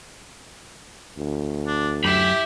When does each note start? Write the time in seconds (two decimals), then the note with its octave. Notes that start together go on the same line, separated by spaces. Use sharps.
1.17 D2
1.67 D4
2.04 F#2 G4 E5 B5